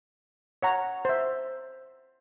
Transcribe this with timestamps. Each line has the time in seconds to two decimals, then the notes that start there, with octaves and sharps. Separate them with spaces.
0.62 C#5 F#5 A#5
1.05 C5 E5